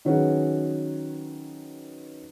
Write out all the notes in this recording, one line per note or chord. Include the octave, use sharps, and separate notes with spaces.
D#3 F#3 C#4 F#4 G#4 B4